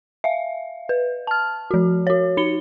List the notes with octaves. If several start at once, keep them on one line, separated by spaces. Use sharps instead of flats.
E5 F5
B4
A5 F6
F3 F#4
F#4 C#5
D#4 C#7 G7